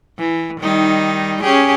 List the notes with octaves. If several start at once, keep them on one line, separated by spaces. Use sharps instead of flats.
E3
D#3 G3 D#4
C#4 G4 G#4